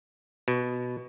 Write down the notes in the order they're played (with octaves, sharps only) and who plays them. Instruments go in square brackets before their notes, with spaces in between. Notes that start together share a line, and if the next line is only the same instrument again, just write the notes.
[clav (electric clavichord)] B2